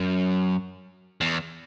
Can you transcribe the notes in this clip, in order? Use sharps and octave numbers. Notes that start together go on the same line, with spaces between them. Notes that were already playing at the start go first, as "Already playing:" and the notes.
Already playing: F#2
E2